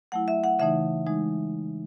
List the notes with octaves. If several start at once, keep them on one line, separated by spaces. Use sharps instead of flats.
F#3 A3 E4 F#5
E5
F#5
C#3 E3 A3 D#4 E5
E3 G#3 D#4